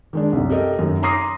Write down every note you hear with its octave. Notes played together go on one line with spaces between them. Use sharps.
D#3 G#3 D4
C2 F#2
G4 A4 A#4 D#5
F#2 D#3
A#5 C6 D6 D#6 A#6 C7